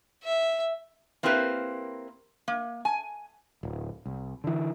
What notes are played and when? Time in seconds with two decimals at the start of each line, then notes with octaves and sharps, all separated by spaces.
0.24 E5
1.23 A#3 C4 E4 G4 A#4 B4
2.48 A#3
2.85 G#5
3.63 D1
4.06 C2
4.44 D3 E3